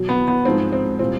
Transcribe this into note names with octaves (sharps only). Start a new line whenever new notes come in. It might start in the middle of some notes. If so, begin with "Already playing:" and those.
Already playing: B2 F#3
B3
B3
G#2 F3 G#3 C4
C4
A#2 G3 C4